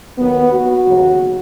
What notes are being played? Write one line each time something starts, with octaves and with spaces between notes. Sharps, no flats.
D#2 D#3 F#3 B3
F#4
D#2 C#3 F#3